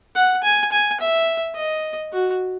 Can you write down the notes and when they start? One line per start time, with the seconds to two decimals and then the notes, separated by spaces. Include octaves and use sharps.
0.16 F#5
0.44 G#5
0.72 G#5
1.00 E5
1.56 D#5
2.13 F#4